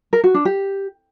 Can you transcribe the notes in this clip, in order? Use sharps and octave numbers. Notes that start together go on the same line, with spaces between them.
A#4
F#4
D4
G4